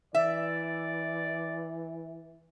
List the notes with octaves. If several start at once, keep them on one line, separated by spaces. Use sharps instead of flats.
E3 D5 E5